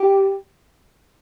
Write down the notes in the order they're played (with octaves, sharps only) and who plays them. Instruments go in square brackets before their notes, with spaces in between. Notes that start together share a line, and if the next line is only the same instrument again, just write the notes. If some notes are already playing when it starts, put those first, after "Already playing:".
Already playing: [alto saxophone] G4